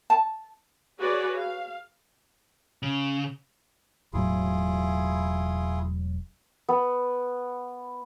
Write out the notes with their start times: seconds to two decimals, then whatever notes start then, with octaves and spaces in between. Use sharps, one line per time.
0.10 A5
1.00 F#4 G#4 B4 C#5 D5
1.35 F5
2.83 C#3
4.13 E1 A2 F#3 E4 F4 G#4
6.69 B3